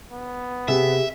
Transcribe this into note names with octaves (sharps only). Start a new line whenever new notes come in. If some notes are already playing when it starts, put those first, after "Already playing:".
B3
C3 G4 G#4 E5